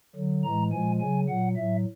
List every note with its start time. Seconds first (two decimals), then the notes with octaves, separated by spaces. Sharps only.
0.16 D3 F#3
0.44 A2 E3 G#3 A#5
0.72 A#2 F3 G#3 G#5
1.00 C#3 F#3 G#5
1.29 A#2 F#3 F#5
1.56 A2 F#3 E5